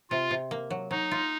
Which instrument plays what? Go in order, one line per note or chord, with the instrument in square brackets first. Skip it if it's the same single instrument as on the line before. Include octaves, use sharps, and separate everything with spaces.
[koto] C3 [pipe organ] F4
[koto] C3
A#3
F#3
[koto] F#3 [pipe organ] D#4
[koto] F4